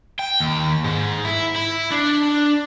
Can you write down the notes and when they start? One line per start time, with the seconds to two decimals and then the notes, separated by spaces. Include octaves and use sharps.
0.19 G5
0.40 D#2
0.84 G#2
1.25 E4
1.56 E4
1.92 D4